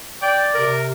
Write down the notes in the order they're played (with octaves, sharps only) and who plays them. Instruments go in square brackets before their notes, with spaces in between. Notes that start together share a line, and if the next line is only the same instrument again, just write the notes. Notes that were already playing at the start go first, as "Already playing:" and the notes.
[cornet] D5 [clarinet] G5
[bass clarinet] C3 [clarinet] A#4